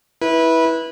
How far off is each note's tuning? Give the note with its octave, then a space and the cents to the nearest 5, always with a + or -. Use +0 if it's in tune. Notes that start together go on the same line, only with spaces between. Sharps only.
E4 -15 B4 -15